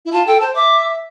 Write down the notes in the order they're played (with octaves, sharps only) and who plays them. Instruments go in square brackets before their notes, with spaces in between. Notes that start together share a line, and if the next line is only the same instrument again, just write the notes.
[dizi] E4
[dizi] F4 [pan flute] A5
[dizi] A4 [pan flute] G5
[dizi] C5 [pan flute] A5
[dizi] E5 [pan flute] D6